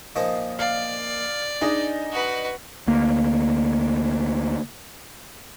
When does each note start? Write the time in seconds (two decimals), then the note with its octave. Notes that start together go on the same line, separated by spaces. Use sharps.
0.16 A#2 F3 D#4
0.59 D5 F5
1.61 D4 D#4 G#4 D#5
2.12 F#4 B4
2.87 D2 A#3